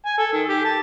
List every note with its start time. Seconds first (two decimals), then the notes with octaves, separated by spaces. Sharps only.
0.06 G#5
0.18 A4
0.33 D#3
0.48 G4
0.65 A5